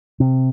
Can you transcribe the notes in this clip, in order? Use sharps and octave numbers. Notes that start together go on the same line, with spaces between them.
C3